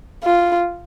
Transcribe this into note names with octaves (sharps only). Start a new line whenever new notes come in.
F4